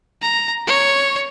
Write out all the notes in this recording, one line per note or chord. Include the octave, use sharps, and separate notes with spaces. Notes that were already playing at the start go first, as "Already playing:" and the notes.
A#5
C#5